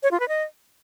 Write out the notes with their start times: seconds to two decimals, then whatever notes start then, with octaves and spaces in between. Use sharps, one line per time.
0.03 C#5
0.11 F4
0.20 B4
0.28 D#5